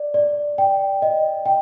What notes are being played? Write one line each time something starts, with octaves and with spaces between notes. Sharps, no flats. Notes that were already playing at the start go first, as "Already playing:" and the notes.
Already playing: D5
D5
G5
D#5
G5